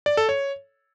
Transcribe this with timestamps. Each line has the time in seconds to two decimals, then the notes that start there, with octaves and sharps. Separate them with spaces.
0.06 D5
0.17 A4
0.29 C#5